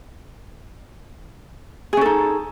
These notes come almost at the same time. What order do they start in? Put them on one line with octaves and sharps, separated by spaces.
G#4 C#4 A4 D#4